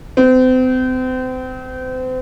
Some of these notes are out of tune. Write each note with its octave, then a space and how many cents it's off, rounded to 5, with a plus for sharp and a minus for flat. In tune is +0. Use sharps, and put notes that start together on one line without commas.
C4 -35